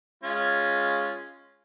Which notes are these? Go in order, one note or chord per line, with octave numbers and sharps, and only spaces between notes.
G#3 C#4 F4